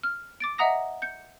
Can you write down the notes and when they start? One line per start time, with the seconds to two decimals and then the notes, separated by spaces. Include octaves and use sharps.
0.03 F6
0.40 D6 A6 D7
0.58 D#5 E5 F#5 A#5 D#6 A#6
1.02 G6 C#7